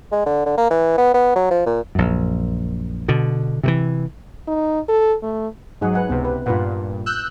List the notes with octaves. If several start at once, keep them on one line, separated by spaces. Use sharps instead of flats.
G#3
D3
D3
A#3
E3
B3
B3
F#3
F3
A#2
A#1 F#2
B2 D3
C3 D#3 E3
D#4
A4
A3
G#2 F#3 D#4 G#4 F#5
B4 F#5 G#5
C#2 C3 B3
B4
G2 A#2 F4 B4 F#5
E6 F#6 G6